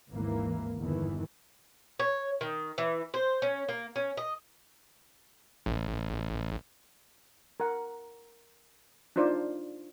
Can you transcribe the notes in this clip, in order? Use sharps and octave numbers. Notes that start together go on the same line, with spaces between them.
G#1 D#2 E3 A#3
G1 E2 D#3 E3
C#5
D#3
E3
C5
C#4
A#3
C#4
D#5
A1
A#4 F#5
D4 D#4 F4 C5 D5